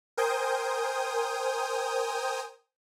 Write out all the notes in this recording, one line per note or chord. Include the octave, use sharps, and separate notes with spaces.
A#4 C5 G5 G#5 D#6 G6